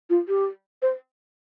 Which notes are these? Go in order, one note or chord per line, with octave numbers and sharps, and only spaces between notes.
F4
G4
C5